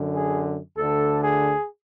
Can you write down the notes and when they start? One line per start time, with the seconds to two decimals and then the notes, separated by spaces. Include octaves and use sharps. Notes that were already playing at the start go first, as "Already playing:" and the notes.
Already playing: F#2 D3
0.15 G#4
0.77 D2 D3 A4
1.23 G#4